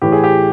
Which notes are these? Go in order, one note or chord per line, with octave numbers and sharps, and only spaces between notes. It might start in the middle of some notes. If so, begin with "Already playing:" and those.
A2 E3 G4
G#4
G4